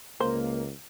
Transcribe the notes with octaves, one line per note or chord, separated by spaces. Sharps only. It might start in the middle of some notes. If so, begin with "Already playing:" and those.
C#2 A#3 C5